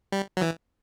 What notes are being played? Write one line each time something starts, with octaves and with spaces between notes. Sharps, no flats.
G3
F#3
E3